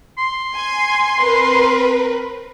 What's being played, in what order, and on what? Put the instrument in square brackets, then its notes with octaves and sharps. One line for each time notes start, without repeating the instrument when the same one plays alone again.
[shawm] C6
[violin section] G#5
C4 A#4 B4